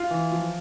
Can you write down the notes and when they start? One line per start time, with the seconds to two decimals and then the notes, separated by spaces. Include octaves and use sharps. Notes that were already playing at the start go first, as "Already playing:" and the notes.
Already playing: F4
0.11 E3
0.32 F3